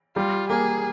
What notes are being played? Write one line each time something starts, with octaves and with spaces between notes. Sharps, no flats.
G3 F4
A#3 G#4